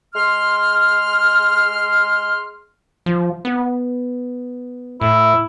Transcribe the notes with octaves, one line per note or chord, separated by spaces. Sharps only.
G#3 C6 F6
F3
B3
A2 E4